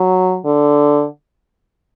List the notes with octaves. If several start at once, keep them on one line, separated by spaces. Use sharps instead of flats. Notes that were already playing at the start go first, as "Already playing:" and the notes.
Already playing: F#3
D3